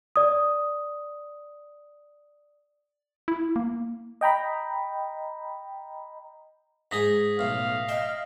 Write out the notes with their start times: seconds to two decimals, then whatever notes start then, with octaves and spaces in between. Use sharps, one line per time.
0.16 D5 D#6
3.28 E4
3.56 A#3
4.21 D#5 G5 A#5 B5
6.91 G#2 D#4 G#4 D#6 A#6 B6
7.39 B1 A2 F5
7.89 D#5 E5 G5